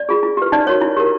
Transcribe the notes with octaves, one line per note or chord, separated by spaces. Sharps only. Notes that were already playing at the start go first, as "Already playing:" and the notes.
Already playing: D5
F4 G#4
E4
G4 B4
D#4 D5
F#4 A#4 C#5
E4
G4 A#4